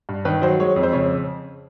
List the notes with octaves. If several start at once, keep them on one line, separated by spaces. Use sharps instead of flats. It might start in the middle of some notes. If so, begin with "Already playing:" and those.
G2
D#3 B4
F#3 C5
G#3 C#5
F2
C5
C#3 C#5